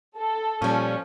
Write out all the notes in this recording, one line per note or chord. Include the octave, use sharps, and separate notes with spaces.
A4
A#2 F3 G3 C#4